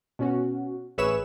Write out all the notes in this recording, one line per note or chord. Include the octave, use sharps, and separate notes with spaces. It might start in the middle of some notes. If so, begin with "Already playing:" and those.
B2 C#4 F#4
A1 G#4 B4 C#5 E5 E7